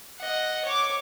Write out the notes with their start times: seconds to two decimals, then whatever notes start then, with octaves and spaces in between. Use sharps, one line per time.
0.19 D#5 F#5
0.65 C#5 D6